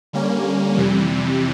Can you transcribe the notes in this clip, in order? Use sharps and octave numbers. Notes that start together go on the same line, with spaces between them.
D3 G3 A#3 C#4
F2 C3 E3 G3